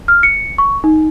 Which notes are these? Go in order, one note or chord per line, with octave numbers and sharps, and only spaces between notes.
F6
C#7
C#6
D#4